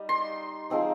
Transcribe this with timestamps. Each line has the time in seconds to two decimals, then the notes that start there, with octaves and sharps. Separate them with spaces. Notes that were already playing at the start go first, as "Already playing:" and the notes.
Already playing: G3 D#4
0.09 C6
0.70 F3 G#3 C4 D#4